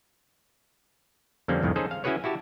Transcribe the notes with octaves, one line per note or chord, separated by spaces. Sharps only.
F2 D3 G3 A#3 C4 C#4
C2 F2 A2 D#3
C#4 D#4 G#4 A4 C5
F5
C#4 E4 F#4 G#4 B4 C#5
E4 F#4 G4 A5